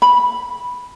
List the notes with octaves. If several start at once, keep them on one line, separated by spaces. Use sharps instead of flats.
B5